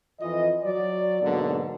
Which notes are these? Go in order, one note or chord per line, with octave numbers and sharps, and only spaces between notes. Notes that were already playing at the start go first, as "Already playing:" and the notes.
F2 E3 F4 D#5
F#3 D5
G#2 B2 D3 F#3 A#3